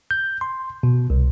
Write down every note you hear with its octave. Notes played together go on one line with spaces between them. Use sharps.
G6
C6
B2
C2